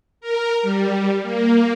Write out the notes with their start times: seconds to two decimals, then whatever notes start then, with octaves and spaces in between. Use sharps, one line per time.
0.21 A#4
0.63 G3
1.23 A#3